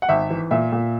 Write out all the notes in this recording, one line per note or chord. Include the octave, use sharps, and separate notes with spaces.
F#5
G#1 E5
E3
A#2 E5
A#2